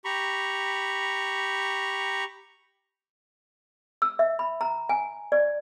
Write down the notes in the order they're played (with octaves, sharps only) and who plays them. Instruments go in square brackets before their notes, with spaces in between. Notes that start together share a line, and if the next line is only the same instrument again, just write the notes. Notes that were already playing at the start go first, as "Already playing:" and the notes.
[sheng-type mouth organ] G4 A#5 B5 C#6
[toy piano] E6
E5
B5
A#5
G#5
D5